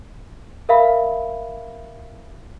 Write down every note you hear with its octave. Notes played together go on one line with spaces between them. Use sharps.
A#4 E5 F5 B5